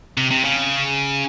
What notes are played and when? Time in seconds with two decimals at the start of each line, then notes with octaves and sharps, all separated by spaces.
0.17 C3
0.31 C3
0.44 C#3